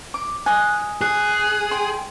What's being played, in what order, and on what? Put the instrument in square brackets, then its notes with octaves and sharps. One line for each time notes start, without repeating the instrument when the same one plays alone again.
[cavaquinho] D6
[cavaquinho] D#5 G#5 [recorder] F#6
[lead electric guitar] G#4 [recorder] F#6
[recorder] G5 [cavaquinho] C6